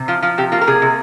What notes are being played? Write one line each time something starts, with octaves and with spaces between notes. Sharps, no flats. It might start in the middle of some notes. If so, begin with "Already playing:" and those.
Already playing: C3
F3 F4
F3 F4
C3 G4
A#3 F4
A#4
C3 G#4
C3